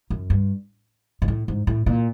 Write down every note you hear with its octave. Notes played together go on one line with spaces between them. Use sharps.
F#2
G2
G#2
A2
G#2
A2
A#2